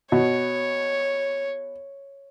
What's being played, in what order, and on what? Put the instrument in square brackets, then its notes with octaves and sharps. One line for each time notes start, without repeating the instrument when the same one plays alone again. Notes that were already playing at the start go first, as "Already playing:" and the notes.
[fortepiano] B2 [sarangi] C#5